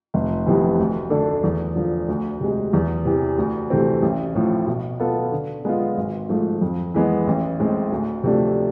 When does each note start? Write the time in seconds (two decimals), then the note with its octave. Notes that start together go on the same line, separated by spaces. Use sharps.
0.14 F1
0.46 F2 C3 E3 B3
0.79 D2
1.10 D3 A3 D4 A4
1.44 E2
1.76 D3 F3
2.08 D2
2.41 C3 G#3
2.73 E2
3.06 C3 E3
3.38 D2
3.70 C3 E3 A3 C4
4.02 A1
4.35 A2 F3
4.67 B2
5.00 B3 F4 A4
5.32 D3
5.65 G#3 B3 F4
5.97 G#1
6.29 G#2 F3 A3
6.61 F2
6.94 E3 G#3 B3
7.27 A1
7.59 A2 G#3 C4
7.92 D2
8.24 C3 F3 A3 D4